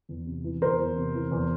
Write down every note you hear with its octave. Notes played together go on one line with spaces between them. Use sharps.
E2
C3
E3
E2 A#4 C5
E2
C3
E3
E2